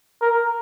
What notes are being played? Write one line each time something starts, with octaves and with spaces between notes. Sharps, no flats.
A#4